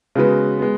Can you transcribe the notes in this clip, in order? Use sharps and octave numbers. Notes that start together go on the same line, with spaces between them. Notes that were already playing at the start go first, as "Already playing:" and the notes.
C#3 G#3 B3 F#4 B4
G#3 B3